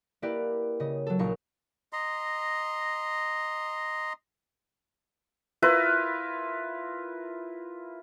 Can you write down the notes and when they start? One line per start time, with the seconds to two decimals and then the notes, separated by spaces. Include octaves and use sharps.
0.22 A#3 E4 G4 A#4 B4 D5
0.80 C#3 D#5
1.07 F#3 A4
1.19 A#1 D#4 A#4 F5 C#6
1.93 D#5 A#5 C6
5.62 E4 F4 A#4 B4